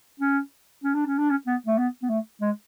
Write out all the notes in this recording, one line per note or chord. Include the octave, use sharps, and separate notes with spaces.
C#4
C#4
D4
C#4
D4
C#4
B3
A3
B3
B3
A3
G#3